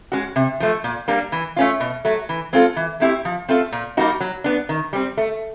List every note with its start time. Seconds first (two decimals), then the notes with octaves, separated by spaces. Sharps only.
0.12 G#3 C#4 F#4
0.36 C3
0.60 F3 A3
0.84 A#2
1.08 G3 A#3 D4
1.32 E3
1.56 A3 C#4 F4
1.80 B2
2.05 F#3 A3
2.29 E3
2.53 G#3 C4 F4 A4
2.76 E3
3.00 A3 C4 E4 G4
3.25 F3
3.48 A3 C4 F4 A4
3.72 A#2
3.97 G3 A#3 D#4 F#4
4.21 F#3
4.44 B3 D4
4.69 D#3
4.93 G3 C4
5.18 A3